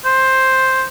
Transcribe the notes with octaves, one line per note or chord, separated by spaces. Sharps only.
C5